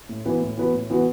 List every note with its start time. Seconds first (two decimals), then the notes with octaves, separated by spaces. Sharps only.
0.09 A2
0.25 E3 B3 F#4 B4
0.42 A2
0.57 E3 B3 F#4 B4
0.74 A2
0.90 E3 B3 F#4 B4